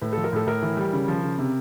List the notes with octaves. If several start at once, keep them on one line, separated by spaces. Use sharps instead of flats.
A2 B4
F3 A4
A#4
A2 A4
A2 A#4
E3
G3
C#3
F3
C#3
C3